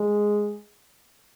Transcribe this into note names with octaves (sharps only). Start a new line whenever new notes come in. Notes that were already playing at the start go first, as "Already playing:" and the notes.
Already playing: G#3